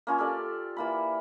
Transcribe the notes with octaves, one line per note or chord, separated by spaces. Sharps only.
A#3 C#4 F4 A5
G4 A4 D5
E3 A#3 B5